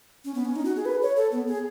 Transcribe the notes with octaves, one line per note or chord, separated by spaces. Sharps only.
C#4
B3
C#4
D#4
F#4
G#4
B4
C#5
A4
B3
G#4